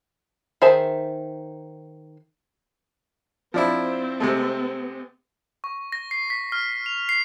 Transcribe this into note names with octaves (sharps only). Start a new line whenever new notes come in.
D#3 G#4 C5 E5 A5
F3 C4 D4 E4
C3 G#3 A3
C#6
A#6
C7
B6
F6
F7
C7